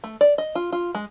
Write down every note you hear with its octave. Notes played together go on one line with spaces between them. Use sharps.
A3
D5
D#5
F4
F4
G#3